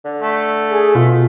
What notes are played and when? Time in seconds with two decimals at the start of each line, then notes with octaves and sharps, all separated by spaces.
0.05 D3
0.22 A3
0.70 G#4
0.95 B2 F4